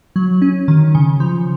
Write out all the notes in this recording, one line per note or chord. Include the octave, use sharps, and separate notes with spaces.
F#3
C#4
D#3
C#3
F3